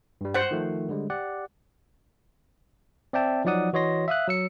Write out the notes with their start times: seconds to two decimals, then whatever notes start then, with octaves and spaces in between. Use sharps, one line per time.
0.21 G2 G3
0.34 C5 F#5
0.51 D#3 F3 A3
0.89 D3 G3 G#3
1.10 G4 D5 F#5
3.13 C4 D5 E5 G5 A5
3.45 F3 F#3 D#4 D5 F#5 D#6
3.73 E3 F#4 C#5 D#5 C6 A#6
4.08 E5 F5 D#6 F#6
4.28 F#3 E6 C#7